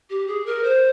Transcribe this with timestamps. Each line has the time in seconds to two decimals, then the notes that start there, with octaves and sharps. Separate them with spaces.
0.10 G4
0.28 G#4
0.46 A#4
0.64 C5